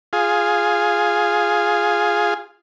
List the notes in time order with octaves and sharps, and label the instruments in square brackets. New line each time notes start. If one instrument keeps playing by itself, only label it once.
[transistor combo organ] F4 G#4